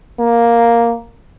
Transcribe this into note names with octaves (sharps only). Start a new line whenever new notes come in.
A#3